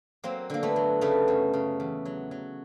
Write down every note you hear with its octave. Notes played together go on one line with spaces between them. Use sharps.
F#3 A#3 C4
D3 A#3
A3 B3
F#3
C#3 A3 B3
F#2
C#3
E2
F#3
F#3